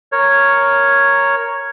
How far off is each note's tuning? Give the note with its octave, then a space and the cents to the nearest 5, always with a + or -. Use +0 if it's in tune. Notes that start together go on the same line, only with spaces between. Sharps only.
A#4 +0 C#5 +0